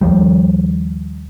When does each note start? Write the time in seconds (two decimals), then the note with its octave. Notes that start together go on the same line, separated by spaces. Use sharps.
0.01 D#2 F3 G3